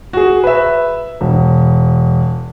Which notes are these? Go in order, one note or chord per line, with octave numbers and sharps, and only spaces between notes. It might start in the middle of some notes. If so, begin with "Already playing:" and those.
F#4 G#4
B4 E5
E1